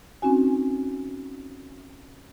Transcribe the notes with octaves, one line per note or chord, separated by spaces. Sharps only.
C4 C#4 D#4 F#4 G#5